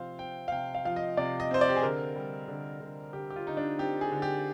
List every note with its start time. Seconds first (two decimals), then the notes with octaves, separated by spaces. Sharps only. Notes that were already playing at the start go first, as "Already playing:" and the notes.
Already playing: C3 F3 C4 C5 F5
0.19 C4 G5
0.48 F5
0.52 C3 G5
0.75 F5
0.85 F3 F5
0.96 D#5
1.17 C3 D5
1.40 D#5
1.51 C4 C5
1.61 D5
1.69 G4
1.76 G#4
1.83 D3 A#4
2.16 G3
2.48 D3
2.81 D3
3.13 D3 G4
3.30 G4
3.36 F4
3.46 D3 D#4
3.57 D4
3.79 C4 G4
4.01 G#4
4.12 D3
4.22 G4